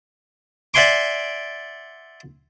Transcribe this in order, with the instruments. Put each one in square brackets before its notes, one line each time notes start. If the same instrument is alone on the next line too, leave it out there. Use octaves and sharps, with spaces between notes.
[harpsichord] D5 E5 F#5 G#5 C6 D6